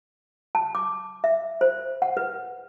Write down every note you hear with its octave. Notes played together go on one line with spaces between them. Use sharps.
A5
D6
E5
C5
F#5
B4